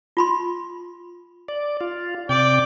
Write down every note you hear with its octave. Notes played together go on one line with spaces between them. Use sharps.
F4 B5 C6
D5
F4
C3 D5 G5